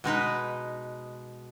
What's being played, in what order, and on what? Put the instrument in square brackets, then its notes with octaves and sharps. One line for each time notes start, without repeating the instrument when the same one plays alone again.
[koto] B2 G#3 D#4 B4